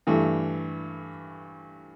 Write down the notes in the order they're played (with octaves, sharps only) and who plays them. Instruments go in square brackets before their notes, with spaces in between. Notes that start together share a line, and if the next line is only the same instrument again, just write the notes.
[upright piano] G2 E3 A3